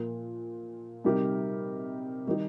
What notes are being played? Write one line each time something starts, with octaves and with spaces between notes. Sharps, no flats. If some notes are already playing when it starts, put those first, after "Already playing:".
Already playing: A#2 F3 A#3 F4
C3 G3 D#4 G4 A#4
D#3 G3 D#4 G4